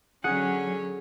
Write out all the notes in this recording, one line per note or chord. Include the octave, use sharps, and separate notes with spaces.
D3 F#3 C#4 G#4 F#5 G#6